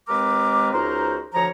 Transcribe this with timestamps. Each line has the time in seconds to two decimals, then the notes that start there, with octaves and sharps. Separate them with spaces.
0.09 D#2 G#3 C4 A#4 B4 D6
0.73 C#2 D#4 F#4 A#4 C5
1.34 D2 F3 C#5 A#5